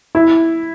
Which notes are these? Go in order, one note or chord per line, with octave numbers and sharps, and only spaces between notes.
E4